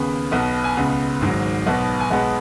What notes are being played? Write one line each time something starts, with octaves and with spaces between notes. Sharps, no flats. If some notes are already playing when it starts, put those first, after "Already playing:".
Already playing: D#2 C#3 B3
B1 B2 B3 F#5
G#5
C#2 C#3 B3 F#5
G#1 G#2 F#3
B1 B2 B3 F#5
G#5
B1 B2 G#3 B3 F#5